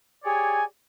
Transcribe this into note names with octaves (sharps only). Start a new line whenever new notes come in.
G4 G#4 C#5 D5 G#5